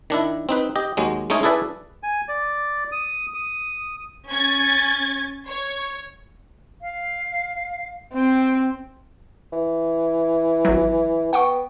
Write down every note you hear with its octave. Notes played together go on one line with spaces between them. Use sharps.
D#3 D4 E4
C4 D#4 B4
G4 D#5
D#2 F#3 G#3
G#3 A3 C#4 D#4 G#4
E4 G#4 A4 B4 D5 E5
G#5
D5
D#6
D#6
C#4 G#6 A6
C#5
F5
C4 G5
E3
G#1 F#3
B3 F#5 G5 C#6